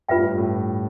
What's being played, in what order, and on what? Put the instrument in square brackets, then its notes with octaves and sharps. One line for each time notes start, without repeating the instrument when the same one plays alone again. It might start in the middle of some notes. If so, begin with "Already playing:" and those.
[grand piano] G2 [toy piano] F4 B4 E5 G5
[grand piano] A2
G2
A2